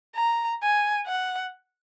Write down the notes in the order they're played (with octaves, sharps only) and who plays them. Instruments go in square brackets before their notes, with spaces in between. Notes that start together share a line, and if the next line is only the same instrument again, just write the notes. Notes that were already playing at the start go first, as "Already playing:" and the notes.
[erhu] A#5
G#5
F#5